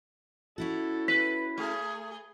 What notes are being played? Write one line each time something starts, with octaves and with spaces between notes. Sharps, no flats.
C#4 E4 F#4 A4
B4 B6
A3 G#4